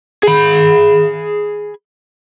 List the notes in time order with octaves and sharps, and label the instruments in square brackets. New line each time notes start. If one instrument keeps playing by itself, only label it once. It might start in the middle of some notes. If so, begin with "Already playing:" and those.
[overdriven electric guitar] G#4 B5